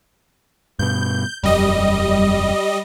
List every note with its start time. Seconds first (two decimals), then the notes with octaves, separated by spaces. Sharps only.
0.79 G2 B2 G6
1.43 E1 F#2 G3 D#5